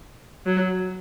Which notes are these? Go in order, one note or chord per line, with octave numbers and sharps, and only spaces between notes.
F#3